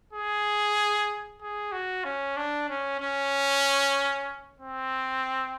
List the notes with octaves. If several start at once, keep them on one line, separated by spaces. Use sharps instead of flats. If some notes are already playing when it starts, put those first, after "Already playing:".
G#4
G#4
F#4
C#4
D4
C#4
C#4
C4